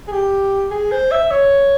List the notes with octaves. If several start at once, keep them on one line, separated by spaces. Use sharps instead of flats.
G#4
G4
G#4
C5
E5
C#5